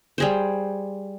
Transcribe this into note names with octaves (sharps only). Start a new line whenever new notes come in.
G3 G#4 C5